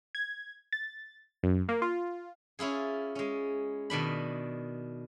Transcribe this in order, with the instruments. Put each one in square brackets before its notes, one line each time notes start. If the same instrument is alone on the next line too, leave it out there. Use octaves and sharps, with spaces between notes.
[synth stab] G#6
A6
F#2
A#3
F4
[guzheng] C#4 E4 F4 G#4
G#3 C#4
B2 D#3 D4 B5